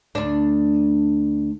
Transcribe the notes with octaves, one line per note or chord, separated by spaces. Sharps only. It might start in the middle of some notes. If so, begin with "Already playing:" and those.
D2 D4